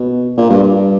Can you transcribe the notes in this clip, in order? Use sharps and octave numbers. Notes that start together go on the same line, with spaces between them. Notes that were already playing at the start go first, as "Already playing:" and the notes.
Already playing: B2
A#2
G2
G2